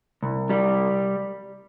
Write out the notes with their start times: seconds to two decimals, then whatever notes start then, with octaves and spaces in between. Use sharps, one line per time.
0.23 C2
0.50 G3